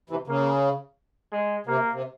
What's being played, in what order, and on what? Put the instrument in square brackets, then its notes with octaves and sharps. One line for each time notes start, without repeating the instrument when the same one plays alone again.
[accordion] C3 E3
[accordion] C#3 [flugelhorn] A#3
[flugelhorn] G#3
[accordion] C3 [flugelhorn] A#3
[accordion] C3